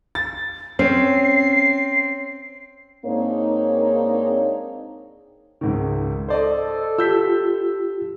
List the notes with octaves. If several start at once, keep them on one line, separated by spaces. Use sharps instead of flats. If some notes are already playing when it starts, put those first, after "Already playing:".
A6
C4 C#4 C7
G#2 A#3 C4 D4 D#4 C#5
C#2 G#2 D#3
A4 C5 D5 D#5
F4 G4 E6 G6 B6